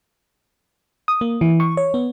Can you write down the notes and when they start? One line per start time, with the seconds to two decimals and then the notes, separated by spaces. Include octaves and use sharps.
1.08 D#6
1.21 A#3
1.41 E3
1.60 C#6
1.77 C#5
1.94 B3